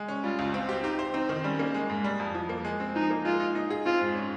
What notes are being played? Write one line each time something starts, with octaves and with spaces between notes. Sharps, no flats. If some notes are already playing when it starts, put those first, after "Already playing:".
Already playing: G#3
C#4
G3 F4
C#2
C4
G4
D#4 G4
C5
C4 D#4
D#3
G3 C#4
A#3
G#3
G#2
G3
F2
F3
A#3
G#3
C4
F3 D#4
A#3
G#3 F4
D#4
D#4
G#4
C4 F4
G#2
C#4